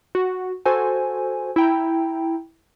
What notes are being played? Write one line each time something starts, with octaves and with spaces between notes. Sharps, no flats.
F#4
F#4 A4 C5 G#5
E4 G5 A#5